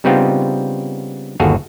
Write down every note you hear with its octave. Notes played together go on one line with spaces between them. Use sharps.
C#3 G3 B3 C4 D#4 F4
G1 D#2 F#4 G#4 A4 F5